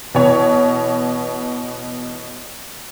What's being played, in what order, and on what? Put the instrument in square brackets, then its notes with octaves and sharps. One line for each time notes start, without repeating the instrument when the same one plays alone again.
[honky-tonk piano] B2 E3 C#5